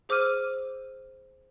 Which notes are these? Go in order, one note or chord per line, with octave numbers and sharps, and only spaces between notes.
G#4 C5 D6 E6 F6 D#7